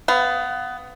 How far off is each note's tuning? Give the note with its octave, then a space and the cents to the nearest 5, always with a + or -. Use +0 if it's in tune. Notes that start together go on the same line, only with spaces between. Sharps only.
B3 +20 F5 +0